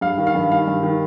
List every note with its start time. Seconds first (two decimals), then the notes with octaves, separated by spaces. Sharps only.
0.01 G2 F5
0.18 D#3
0.27 F5
0.35 G2
0.51 D#3 F5
0.68 G2
0.83 D#3